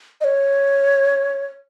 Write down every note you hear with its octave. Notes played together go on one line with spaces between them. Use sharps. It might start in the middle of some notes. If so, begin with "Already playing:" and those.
D#5
C#5